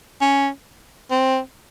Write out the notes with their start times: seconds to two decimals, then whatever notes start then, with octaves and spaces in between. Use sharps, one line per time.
0.21 C#4
1.11 C4